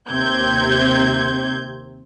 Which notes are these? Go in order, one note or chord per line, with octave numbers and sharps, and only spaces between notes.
D#2 C3 C4 G6 G#6